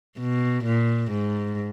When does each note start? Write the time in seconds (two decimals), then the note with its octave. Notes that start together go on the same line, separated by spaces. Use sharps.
0.19 B2
0.65 A#2
1.12 G#2